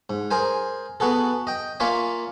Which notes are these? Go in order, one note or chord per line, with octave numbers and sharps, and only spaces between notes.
G#2
G#4 A#4 C5 G#5
B3 F#4 G#4 A4
D#5 G5
A#3 F4 C#5 D5 E5 G#5